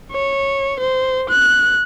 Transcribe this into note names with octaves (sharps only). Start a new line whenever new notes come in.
C#5
C5
F#6